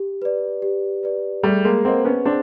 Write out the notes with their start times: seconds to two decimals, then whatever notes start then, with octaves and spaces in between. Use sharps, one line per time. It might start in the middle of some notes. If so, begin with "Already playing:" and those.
Already playing: G4
0.22 B4 D5
0.62 G4
1.03 B4 D5
1.43 G3 A3 G#4
1.65 G#3 A#3
1.85 A#3 C4 B4 D#5 F#5
2.05 B3 C#4
2.25 C4 D4 G#4